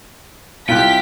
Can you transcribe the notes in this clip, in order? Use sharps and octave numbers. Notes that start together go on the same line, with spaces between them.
C2 E4 F4 G4 G5 F#6 B6